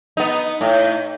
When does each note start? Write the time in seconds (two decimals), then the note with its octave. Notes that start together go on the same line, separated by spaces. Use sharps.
0.17 B3 D#4
0.61 A2